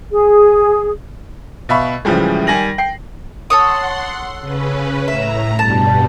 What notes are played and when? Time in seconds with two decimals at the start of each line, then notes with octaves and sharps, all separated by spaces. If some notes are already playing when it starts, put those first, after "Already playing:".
0.12 G#4
1.69 B2 E5 F5 B5 C#6
2.05 A2 C#3 E3 F3 G3 G#3
2.47 D#3 G3 G#5 A#6 F#7
2.78 G5 C7
3.50 A4 C#5 F#5 C6 D#6
4.40 C#3 C#4 B4
5.08 A2 E5 A#5
5.59 G2 B2 G3 A5